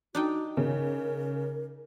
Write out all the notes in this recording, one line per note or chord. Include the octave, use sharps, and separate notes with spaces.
D4 D#4 F#4 G5
C#3 A#4